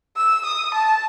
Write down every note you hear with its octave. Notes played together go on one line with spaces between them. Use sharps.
E6
D#6
A5